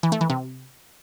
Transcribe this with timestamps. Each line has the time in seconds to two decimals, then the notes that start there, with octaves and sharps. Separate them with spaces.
0.03 E3
0.12 A3
0.21 E3
0.30 C3